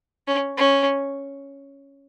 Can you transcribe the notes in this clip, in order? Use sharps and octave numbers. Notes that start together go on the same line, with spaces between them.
C#4
C#4